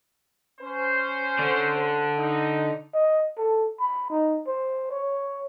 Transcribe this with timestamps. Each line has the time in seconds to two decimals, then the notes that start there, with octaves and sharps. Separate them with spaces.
0.61 C#4 C5
1.39 D3
2.17 D#4
2.94 D#5
3.38 A4
3.80 B5
4.10 D#4
4.47 C5
4.91 C#5